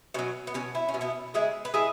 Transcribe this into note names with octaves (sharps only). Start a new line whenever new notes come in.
B2 F#3 C#4
B3
B2 F#3 C#4
E4
C#4
B2 F#3
B3 E4
C#3 G#3 E4 G#4
B4
G#3 E4 G#4